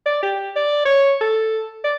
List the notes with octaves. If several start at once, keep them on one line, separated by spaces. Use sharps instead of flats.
D5
G4
D5
C#5
A4
D5